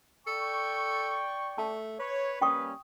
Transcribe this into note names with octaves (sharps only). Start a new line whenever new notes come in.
A4 D5 G5 C#6
A3 A5
B4 C#5
G3 A#3 C#4 G5 C#6 D#6